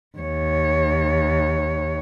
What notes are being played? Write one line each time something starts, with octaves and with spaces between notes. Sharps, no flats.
D#2 C#5